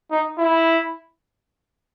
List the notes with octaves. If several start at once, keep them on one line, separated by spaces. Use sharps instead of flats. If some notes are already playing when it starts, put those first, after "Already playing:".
D#4
E4